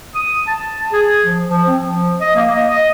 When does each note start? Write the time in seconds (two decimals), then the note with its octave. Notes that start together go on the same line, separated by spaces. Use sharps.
0.14 D#6
0.47 A5
0.93 G#4
1.24 F3
1.49 F3
1.67 C4
1.82 F3
2.20 D#5
2.35 A#3
2.50 D#5
2.70 D#5